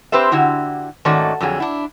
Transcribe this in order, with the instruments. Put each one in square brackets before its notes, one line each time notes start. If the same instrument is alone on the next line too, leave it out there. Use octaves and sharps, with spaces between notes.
[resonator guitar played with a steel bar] C4 G4 B4 C5 E5
D3 E4 F#4 G4
G#2 D#3 A3 C#4 F#4 D5
F2 D3 F#3 F4 G#4
D4 E4